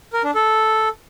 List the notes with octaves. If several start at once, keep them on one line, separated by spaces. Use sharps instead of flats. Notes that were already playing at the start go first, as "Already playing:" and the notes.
A#4
D4
A4